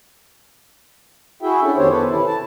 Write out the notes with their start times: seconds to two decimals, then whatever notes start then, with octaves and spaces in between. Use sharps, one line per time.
1.42 E4 F#4 G#4 E5 G5
1.62 C#4 D4 E4 A4
1.77 F2 D#3 B3 G4 C5 C#5
1.90 A4 B4
2.08 C3 E3 E4
2.27 A5